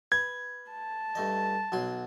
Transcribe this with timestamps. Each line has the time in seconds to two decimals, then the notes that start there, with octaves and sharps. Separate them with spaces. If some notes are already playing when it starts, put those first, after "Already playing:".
0.12 B4 G#6
0.70 A5
1.15 G2 A3 D#5
1.72 B1 F#3 C6